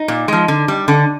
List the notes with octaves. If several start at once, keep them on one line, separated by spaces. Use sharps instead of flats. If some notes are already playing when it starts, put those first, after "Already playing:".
Already playing: D#4
A#2
F3 G#3
D3
G3
D3